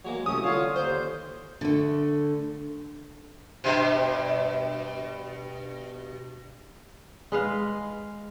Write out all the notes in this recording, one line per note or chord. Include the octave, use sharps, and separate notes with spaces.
F#3 G#3 A#3
C2 A3 C#4 D#6
D3 F4 C#5 F5
D#2 C5 G6
D3 A3
G2 B2
G#3 B4 F5